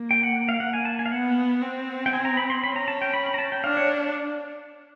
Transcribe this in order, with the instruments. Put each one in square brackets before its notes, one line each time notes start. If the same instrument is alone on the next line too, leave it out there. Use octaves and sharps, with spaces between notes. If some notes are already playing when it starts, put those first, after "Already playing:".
Already playing: [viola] A#3
[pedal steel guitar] G5
F#5
F5
[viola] A#3 [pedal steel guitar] F#5
[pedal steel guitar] G#5
A5
G#5
F5
[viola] B3 [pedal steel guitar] F#5
[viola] C4
[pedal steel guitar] G5
G#5
A#5
B5
C6
[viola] C#4 [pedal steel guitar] B5
[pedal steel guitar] A#5
A5
G5
B5
B5
A#5
A5
G5
[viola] D4 [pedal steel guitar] F5
[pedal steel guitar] C#5